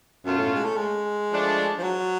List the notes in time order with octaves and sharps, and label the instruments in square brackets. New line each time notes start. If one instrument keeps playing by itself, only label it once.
[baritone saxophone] F#2 [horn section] B2 A3 C#4 F4
[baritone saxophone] A2
G#3
A3
G#3
[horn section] F3 A3 D4
[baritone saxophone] F3
F#3